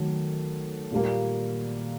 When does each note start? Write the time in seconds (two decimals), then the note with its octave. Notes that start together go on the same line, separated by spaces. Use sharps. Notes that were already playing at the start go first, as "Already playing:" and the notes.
Already playing: D#3 F#3 A3
0.91 A#2 G3 A#3